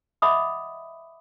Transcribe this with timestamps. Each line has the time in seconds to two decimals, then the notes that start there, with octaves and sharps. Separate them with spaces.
0.22 D#5 E5 F#5 B5 D6 D#6